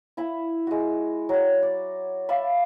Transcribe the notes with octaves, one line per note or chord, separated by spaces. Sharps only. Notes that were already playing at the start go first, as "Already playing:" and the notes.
E4 E5 B5
G#3 F#4
F#3 F#4
D5
D5 E5 F5 B5